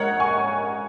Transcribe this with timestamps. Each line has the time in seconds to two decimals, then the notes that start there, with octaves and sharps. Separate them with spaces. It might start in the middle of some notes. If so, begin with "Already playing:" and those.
Already playing: A#1 G#2 A#4 C#5 D#5 F#5
0.20 G#5 C#6